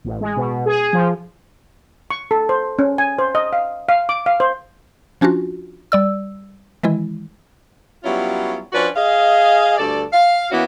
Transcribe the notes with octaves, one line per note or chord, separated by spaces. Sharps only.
A1
G#3
B2
G#4
F3
C#6
A4
C5
C#4
G#5
C5
D#5
F5
F5
D6
F5
C5
F3 C#4 D4 F4 F#4
G3 D5 E6
D#3 E3 G#3 E4
F#3 G3 B3 C#4 E4 F4
F3 C#4 D4 F#4 B4 D5
G#4 D#5 F5
D2 G2 A4 D5
F5
E3 A#3 B3 C#4 E4 F#4